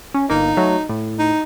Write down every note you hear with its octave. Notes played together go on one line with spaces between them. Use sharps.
C#4
G1 A#3 D#4
F#3 A3
A2
D#4